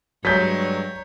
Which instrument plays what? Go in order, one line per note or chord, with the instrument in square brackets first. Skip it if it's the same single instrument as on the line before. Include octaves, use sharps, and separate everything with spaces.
[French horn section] G2 [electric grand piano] F#3 G#3 [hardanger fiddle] C#5 [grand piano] A#5 G6 B6